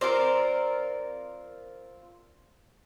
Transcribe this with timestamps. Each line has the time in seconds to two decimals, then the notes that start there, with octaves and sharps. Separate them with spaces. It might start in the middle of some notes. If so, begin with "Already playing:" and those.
0.01 C4 F4 A#4 C5 D5